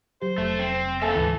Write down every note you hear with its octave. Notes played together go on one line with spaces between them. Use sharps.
F#3 G4 C5
F1 A3
C4
A#3 C4 A4 E5 G#5 E6
D2 G#2 E3